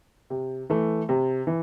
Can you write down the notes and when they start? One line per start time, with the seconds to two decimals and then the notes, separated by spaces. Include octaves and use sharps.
0.30 C3
0.70 E3 A3
1.09 C3
1.47 E3